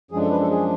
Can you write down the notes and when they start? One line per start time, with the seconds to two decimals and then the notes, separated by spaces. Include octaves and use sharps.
0.11 F#2 F3 G#3 D4 G#4
0.21 A4
0.31 B4
0.40 A4
0.51 G#4